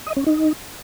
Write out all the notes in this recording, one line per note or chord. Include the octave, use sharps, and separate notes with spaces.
D#5
C#4
D#4